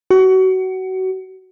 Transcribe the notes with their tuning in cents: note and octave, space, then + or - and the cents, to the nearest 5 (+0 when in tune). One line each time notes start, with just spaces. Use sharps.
F#4 +25